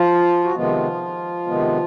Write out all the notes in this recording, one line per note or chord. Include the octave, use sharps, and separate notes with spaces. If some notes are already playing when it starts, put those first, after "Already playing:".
Already playing: F3 F4
F#4
C3 D#3 F3 G#3 B3 F4
C3 D#3 G#3 B3